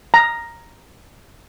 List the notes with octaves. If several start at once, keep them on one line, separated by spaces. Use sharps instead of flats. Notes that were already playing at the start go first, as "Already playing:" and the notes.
A#5